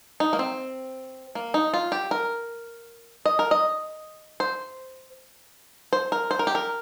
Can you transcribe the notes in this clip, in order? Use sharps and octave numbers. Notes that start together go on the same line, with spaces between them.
D#4
A#3
C4
A#3
D#4
F4
G4
A#4
D#5
A#4
D#5
C5
C5
A#4
C5
A#4
G4
A#4